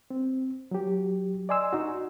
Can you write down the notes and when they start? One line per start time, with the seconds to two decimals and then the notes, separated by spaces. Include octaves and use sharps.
0.10 C4
0.71 F#3 G4
1.49 D5 D#5 G#5 C6 E6
1.73 D#4 F#4